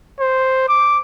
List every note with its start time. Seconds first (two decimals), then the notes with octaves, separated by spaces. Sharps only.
0.20 C5
0.69 D6